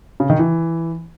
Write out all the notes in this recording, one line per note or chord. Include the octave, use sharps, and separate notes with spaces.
C#3
D#3
E3